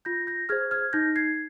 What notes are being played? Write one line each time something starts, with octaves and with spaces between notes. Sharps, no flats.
F4 G6 A#6
G6 A#6
G#4 C5 F6 G#6
F6 G#6
D#4 G6 A#6
G#6 C7